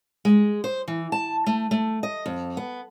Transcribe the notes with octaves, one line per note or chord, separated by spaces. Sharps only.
G#3
C5
E3
A5
A3
A3
D#5
F2
B3